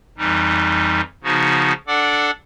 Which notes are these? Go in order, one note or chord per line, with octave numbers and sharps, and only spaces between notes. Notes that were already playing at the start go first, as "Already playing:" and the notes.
F2 E3 G3 D#4
C#3 F3 B3 D#4 F#4
D4 A4 D5 F#5 D6